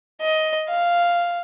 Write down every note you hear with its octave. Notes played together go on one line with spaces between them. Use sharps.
D#5
F5